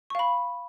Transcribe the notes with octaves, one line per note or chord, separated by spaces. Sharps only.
F5 B5 C#6